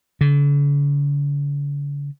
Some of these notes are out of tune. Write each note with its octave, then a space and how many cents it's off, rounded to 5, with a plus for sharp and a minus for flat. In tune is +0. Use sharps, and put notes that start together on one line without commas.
D3 -45